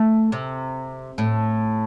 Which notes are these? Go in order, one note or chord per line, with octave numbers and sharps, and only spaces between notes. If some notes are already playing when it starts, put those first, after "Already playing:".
Already playing: A3
C3
A2